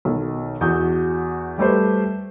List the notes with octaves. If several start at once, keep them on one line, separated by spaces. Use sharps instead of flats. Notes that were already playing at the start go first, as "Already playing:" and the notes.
B1 D#3
E2 F#4 D#6 G6
G3 A3 G4 B4 C5